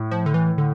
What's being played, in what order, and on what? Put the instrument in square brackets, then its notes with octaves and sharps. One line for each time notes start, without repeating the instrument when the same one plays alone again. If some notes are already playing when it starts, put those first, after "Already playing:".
Already playing: [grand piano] A2
[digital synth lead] F3
D3
E3
D3